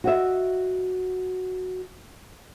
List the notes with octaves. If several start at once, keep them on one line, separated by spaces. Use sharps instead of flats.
F#4 D#5 E5